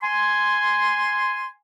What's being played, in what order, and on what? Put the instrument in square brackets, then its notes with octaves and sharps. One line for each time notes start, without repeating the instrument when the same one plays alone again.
[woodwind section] G#5 C6